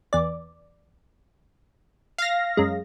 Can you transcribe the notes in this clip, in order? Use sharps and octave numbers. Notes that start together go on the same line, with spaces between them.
E2 D5
F5 A#6
F#2 G#3